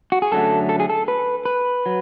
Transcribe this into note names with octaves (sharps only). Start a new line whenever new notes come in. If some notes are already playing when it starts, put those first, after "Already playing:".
F#4
G#4
F#2 D3 F#3 A3 A4
A4
G#4
A4
B4
B4
F#3